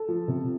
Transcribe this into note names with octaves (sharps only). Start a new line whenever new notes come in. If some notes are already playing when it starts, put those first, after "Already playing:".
Already playing: A4
F3
C3